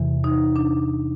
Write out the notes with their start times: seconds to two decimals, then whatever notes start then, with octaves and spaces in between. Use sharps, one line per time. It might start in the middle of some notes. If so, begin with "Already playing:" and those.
Already playing: E2 C3 E3
0.24 D#4
0.56 D4